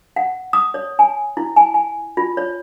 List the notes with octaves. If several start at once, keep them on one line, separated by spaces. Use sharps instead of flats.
F#5
D#6
C#5
G#5
E4
G#5
G#5
F4
C#5